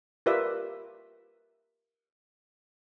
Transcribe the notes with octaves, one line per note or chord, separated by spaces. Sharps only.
F4 G4 A#4 B4 D5 E5